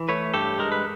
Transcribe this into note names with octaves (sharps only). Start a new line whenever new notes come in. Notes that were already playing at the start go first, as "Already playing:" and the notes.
Already playing: E3
A3 B4 C#5
G2 G4 A4
G#3 A#4
B4